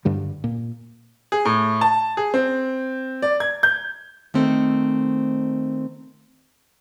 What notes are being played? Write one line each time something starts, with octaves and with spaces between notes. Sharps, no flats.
G2 D3 G3
A#2
G#4
A2
A5
G#4
C4
D5
G#6
G6
D#3 A3 C4 A4 C5